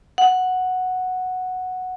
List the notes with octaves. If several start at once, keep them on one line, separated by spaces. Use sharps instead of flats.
F#5